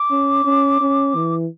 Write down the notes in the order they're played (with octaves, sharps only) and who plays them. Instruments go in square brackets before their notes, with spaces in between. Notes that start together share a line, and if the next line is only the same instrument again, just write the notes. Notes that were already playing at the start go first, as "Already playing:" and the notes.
Already playing: [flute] D6
[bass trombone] C#4
C#4
C#4
E3